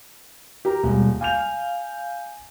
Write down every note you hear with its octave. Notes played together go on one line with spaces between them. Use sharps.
G4 A#4 A#5
D#1 B2 G3 G#3
F5 G#5 G6 F7